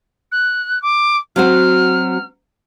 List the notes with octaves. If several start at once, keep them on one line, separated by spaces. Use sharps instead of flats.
F#6
D6
F#3 C4 F#4 F6